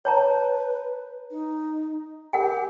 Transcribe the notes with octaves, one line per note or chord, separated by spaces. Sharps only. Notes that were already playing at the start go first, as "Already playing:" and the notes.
B4 C#5 A5 A#5
D#4
G4 A#4 F#5 G#5